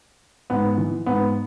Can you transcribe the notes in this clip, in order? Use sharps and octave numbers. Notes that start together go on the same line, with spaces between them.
G#2 B3
E3
G#2 B3